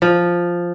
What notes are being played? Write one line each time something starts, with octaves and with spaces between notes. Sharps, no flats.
F3